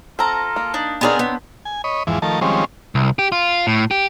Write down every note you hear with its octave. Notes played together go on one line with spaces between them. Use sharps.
C4 F4 A4 A#5
A#3
D4 D#4
B3 C4 D#4 G#4 A#4 C#5 D5
B3
G#5
C#5 D#5 B5
E2 G#2 E3 F3
D#3 F3 A3 A#4 A5
D#3 F3 G3 G#3 C4 C#4
C2
G4
F4
A2
G4